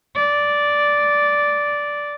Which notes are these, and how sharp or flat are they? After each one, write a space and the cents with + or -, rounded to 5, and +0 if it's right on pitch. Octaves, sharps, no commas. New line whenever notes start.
D5 -5